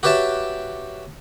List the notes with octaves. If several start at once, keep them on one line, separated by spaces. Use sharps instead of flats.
F#4 G4 B4 C#5 E5 A5